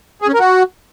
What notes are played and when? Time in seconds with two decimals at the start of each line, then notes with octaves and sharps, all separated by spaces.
0.22 G#4
0.28 C#4
0.34 A#4
0.40 F#4